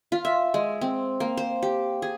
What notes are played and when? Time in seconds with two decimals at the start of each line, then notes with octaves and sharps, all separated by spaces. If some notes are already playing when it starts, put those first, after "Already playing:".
0.12 F4
0.25 E5
0.54 G#3
0.81 C4
1.20 A#3
1.37 C5
1.62 G4
2.02 G#4